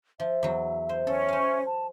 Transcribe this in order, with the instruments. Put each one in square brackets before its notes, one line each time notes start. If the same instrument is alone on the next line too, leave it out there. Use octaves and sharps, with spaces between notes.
[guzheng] F3 [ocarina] E5
[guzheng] E2 F#3
C5
[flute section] C#4 [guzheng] A4
[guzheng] C5 F5
[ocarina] A5